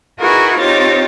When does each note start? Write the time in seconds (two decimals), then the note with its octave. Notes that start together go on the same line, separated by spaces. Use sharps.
0.19 D#4 E4 F#4 G#4 A#4 B4
0.59 C4 D#4 F4 G4 C#5 A6